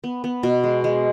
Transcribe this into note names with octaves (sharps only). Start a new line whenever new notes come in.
B3
B3
B2
G#3
G#3